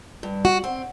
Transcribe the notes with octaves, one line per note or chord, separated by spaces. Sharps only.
G2
F#4
C4